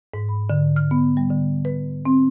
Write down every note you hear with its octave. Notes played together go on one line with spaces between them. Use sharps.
G#2
B5
D3
F6
B3
G3
D3
B4
C4